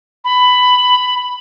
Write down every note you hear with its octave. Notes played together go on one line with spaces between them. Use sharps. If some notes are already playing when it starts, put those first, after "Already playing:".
B5